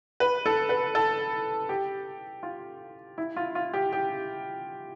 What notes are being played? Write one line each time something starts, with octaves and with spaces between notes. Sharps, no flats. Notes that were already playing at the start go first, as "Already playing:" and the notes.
B4
A4
B4
A4
G4
F4
E4
F4
F4
G4
G4